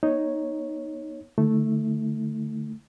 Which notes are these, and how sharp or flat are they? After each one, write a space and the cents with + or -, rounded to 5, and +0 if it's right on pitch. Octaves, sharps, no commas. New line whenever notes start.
B3 -30 D#4 +0 C#5 -5
D3 +5 A3 +0 E4 -40